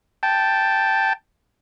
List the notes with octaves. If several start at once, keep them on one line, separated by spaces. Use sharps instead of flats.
G5 A5